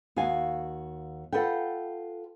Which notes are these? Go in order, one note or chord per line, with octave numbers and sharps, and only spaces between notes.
D#2 F#4 F5 G#5
F4 G4 A4 B4 F#5 G5